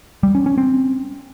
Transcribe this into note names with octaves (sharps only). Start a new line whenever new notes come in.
G3
C#4
C#4
C4